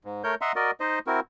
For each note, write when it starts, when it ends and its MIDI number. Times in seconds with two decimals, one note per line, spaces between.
0.05 0.23 44
0.24 0.35 57
0.24 0.35 70
0.24 0.35 73
0.24 0.35 91
0.41 0.52 75
0.41 0.52 76
0.41 0.52 78
0.41 0.52 82
0.41 0.52 84
0.56 0.71 66
0.56 0.71 70
0.56 0.71 74
0.56 0.71 75
0.80 0.99 63
0.80 0.99 72
0.80 0.99 75
1.07 1.20 60
1.07 1.20 64
1.07 1.20 66
1.07 1.20 70